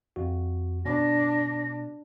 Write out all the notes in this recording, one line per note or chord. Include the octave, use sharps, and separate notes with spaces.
F2 F#4
B2 D4 A#6